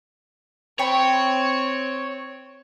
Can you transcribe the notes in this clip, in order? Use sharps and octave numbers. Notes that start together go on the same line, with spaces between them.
C4 C#5 G5 B5 C#6